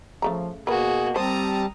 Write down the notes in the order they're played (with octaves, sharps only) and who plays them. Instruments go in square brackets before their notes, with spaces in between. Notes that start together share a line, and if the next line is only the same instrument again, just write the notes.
[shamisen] C#3 A3 A#5 [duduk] F3
[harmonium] B2 [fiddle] A#3 F#4 [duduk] G#4 [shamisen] A#4 B4
[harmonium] G3 A5 [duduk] C4 [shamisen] C5 [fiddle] A#5 D#6